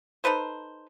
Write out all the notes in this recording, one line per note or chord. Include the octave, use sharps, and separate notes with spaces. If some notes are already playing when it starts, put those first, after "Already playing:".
D#4 A4 B4 C5